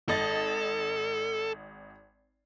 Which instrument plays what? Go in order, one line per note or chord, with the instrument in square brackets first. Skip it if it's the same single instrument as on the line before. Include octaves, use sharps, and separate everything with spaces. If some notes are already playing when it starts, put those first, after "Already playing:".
[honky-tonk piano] G#1 D#5 A6 [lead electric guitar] A4